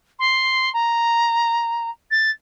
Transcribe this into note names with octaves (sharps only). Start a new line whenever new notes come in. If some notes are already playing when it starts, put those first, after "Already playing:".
C6
A#5
A6